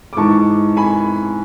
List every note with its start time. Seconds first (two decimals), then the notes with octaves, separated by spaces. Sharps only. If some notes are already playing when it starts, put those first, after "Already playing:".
0.13 D6
0.17 G#2 E3 A5 C#6
0.76 G#5 B5